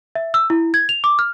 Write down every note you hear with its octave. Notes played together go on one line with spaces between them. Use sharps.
E5
E6
E4
G#6
F7
D6
F6